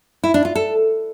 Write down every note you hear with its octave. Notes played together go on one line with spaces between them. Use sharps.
E4
D4
F4
A4